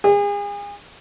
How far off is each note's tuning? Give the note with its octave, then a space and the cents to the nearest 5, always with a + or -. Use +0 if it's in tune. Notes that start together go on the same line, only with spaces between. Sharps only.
G#4 -35